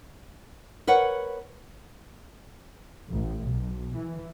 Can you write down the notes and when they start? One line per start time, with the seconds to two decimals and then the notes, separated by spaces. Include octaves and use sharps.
0.87 A#4 B4 C#5 F#5
3.10 A1
3.45 B1
3.95 E3